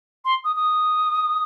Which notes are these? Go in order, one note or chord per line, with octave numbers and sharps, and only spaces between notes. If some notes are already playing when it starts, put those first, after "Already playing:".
C6
D#6
D#6